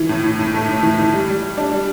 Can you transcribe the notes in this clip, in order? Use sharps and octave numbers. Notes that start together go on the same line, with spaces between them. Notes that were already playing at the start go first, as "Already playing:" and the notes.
Already playing: E3
A2
A2
A2
A3
A2
E3
E3
G3
G3
G3
D4
G3